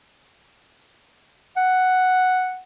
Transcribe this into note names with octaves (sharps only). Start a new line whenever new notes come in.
F#5